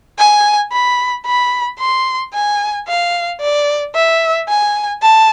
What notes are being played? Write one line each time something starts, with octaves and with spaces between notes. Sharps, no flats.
G#5
B5
B5
C6
G#5
F5
D5
E5
G#5
A5